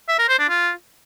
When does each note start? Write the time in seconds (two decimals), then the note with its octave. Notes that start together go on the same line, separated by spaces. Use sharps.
0.09 E5
0.19 A#4
0.29 C5
0.39 D4
0.49 F4